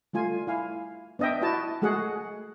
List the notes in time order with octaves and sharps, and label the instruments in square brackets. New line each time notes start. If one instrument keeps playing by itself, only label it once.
[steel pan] G3 A3 F4 G#5
E4 F5 G#5
B3 D4 D#5 E5 G5
E4 F#4 D#5 A5
G#3 A3 F#4 G#4 F#5